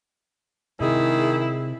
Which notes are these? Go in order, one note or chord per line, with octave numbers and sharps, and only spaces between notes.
C3 D#3 G#3 E4 G#4